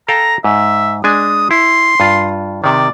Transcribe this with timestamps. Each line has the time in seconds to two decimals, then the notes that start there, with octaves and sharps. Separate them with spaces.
0.08 A4 F5 G5 A#5
0.44 G#2 E5
1.04 G#3 D4 G#5 D#6
1.51 E4 C6
2.00 G2 F4
2.64 C3 D#3 D5